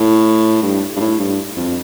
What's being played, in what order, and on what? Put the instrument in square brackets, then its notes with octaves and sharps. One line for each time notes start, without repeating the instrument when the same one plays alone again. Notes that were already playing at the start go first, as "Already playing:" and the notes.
Already playing: [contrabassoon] A2
G2
G2
A2
G2
F2